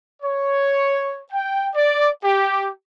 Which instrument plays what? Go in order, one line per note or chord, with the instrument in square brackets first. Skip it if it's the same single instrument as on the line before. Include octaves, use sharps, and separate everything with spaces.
[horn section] C#5
G5
D5
G4